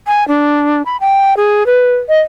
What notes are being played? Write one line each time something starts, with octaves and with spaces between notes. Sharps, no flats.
G#5
D4
B5
G5
G#4
B4
D#5